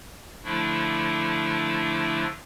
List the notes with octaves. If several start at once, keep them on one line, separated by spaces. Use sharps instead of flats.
D3 F3 A3 D4 E4